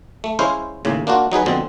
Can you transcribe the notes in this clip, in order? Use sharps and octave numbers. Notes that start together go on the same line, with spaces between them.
A3
G#3 C#4 E4 C5 F5
D#2 A2 C#3
A#3 D4 F4 F#4
F#3 D#4 G#4 B4
A#1 B2 D3 C4